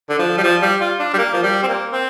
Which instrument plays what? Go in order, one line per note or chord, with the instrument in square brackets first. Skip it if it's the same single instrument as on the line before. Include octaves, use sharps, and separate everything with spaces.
[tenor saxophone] D3
F3
G3
F3
G3
F4
D4
G3
A#3
F3
G3
C4
A#3
C4